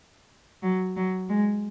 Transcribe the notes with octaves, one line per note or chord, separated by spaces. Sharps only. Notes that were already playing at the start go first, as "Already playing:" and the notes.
F#3
F#3
G#3